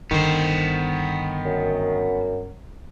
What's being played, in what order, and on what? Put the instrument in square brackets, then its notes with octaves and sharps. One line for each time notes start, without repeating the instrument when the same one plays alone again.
[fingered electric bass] G1 D3 [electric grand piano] D#3 [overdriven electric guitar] B3 C5
[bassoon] F#2